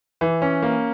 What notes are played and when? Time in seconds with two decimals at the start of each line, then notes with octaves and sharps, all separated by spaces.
0.21 E3
0.42 C#4
0.62 A#3